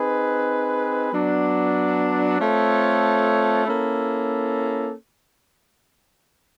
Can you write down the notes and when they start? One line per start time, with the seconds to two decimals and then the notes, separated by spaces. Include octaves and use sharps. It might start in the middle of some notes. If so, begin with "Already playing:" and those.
Already playing: C4 D#4 G#4 B4
1.12 F#3 B3 D4
2.39 A3 C4 F4 A4 C#5
3.66 A#3 C#4 E4 A4